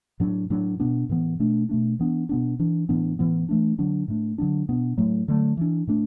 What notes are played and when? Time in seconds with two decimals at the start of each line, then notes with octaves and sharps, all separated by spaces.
0.20 A2 F#3 D4
0.50 A2 F#3 D4
0.80 B2 B3 D4
1.09 A2 E3 B3
1.40 B2 A3 D4
1.69 B2 A3 D4
1.99 E3 B3 D4
2.29 B2 B3 D4
2.59 E3 D4
2.89 A2 E3 B3 D4
3.19 A2 E3 B3
3.49 E3 A3 D4
3.78 D3 F#3 D4
4.08 A2 A3 D4
4.38 D3 F#3 B3 D4
4.69 B2 B3 D4
4.98 A2 F#3 A3
5.28 D3 F#3 A3
5.57 E3 D4
5.87 A2 A3 D4